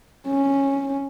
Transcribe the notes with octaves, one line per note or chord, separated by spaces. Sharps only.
C#4